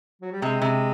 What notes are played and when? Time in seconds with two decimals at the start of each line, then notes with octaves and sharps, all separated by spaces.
0.22 F#3
0.32 G3
0.42 C3 G#3
0.62 C3